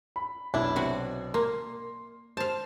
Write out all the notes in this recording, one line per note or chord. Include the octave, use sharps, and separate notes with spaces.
B5
B1 D4 E4
C3 F#4
A#3 C6
C5 F5 A5